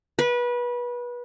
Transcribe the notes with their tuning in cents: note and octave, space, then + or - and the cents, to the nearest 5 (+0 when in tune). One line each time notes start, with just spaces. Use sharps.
B4 -25